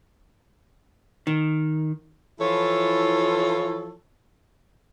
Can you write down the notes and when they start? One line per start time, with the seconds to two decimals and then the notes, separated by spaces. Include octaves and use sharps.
1.27 D#3
2.40 E3 F3 E4 F4 A4 C#5